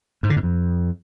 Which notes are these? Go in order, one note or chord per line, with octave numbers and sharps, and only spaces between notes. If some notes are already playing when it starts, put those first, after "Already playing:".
G#2
D3
G#2
F2